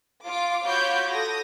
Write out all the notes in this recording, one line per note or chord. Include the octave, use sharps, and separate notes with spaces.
F4 C6 D6
F4 F#4 C#5 B5 D6 G6
A4 D#6 A#6